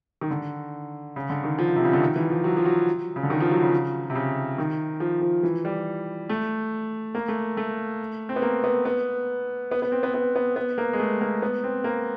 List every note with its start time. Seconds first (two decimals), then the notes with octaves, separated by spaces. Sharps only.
0.21 D#3
0.31 D3
1.16 C#3
1.30 D3
1.44 D#3
1.59 F3
1.76 C3
1.85 C#3
1.93 D3
2.02 D#3
2.16 E3
2.30 F3
2.44 F#3
2.57 F3
2.65 F#3
3.16 C#3
3.23 D3
3.30 D#3
3.40 F3
3.51 F#3
3.62 C#3
4.10 C3
4.15 C#3
4.58 D#3
5.00 F3
5.21 F3
5.43 E3
5.65 G3
6.29 A3
7.15 A#3
7.28 A3
7.57 A3
8.29 C4
8.36 B3
8.42 A#3
8.64 B3
8.85 B3
9.71 B3
9.82 B3
9.92 C4
10.03 B3
10.14 B3
10.36 B3
10.56 B3
10.78 A#3
10.93 G#3
10.99 A3
11.21 A#3
11.42 B3
11.64 C4
11.84 A#3